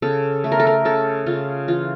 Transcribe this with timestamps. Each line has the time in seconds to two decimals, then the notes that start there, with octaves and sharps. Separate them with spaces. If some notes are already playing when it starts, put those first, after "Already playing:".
0.02 C#3 A4
0.44 A3
0.52 A#4
0.60 A4
0.67 A#4
0.85 C#3 A4
1.26 C#3 F4
1.68 E3 F4